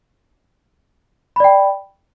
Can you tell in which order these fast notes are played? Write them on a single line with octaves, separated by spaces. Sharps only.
B5 D5 G5